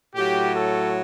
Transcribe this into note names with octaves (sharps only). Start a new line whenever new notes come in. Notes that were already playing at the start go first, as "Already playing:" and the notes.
A2 F#3 G4
A4